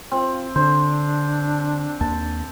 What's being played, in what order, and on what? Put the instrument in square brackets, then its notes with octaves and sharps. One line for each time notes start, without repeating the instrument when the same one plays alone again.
[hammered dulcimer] C4 [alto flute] F4
[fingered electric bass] D3 [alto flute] D4 [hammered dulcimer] C5
[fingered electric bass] D#2 [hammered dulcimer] A5